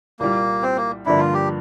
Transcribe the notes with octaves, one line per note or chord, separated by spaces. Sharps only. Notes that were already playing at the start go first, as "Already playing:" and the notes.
C2 A#2 G3 A#3
C4
A#3
G2 D3 F3 A#3 D4 E4
F4
G4